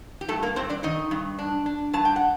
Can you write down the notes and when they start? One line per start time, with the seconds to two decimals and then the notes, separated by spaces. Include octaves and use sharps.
0.21 G4
0.28 G2 A3 A4
0.43 A#3 A#4
0.56 G2 C4 C5
0.70 D4 D5
0.83 D#3 D#4 D#5
1.11 G2
1.39 D4
1.66 D4
1.93 G2 A5
2.05 G5
2.16 F#5